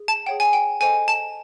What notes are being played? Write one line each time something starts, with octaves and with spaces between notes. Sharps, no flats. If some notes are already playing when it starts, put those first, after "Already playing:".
Already playing: G#4
A5
G#4 C#5 F#5 G5
G#5
G5
A4 C5 D#5 G5 G#5
A5